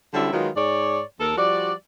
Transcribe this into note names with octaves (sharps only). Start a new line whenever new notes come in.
D3 F#3 G3 C4 C#4 E4
D#3 F#3 G#3 B3 F4
G#2 G#4 C#5 D5
D#2 A4 A#4
F3 G3 F#4 D5